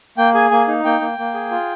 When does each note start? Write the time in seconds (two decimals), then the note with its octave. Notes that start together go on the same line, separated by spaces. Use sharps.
0.18 A#3 G5
0.34 G#4 G#5
0.51 A#3 G#5
0.68 D#4
0.84 A#3 G5
1.01 A#3
1.18 A#3
1.34 G#4
1.51 F4